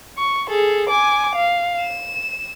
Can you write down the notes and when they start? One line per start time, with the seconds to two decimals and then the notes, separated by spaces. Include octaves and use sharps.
0.18 C#6
0.50 G#4 A4
0.89 G#5 D6
1.35 F5
1.81 E7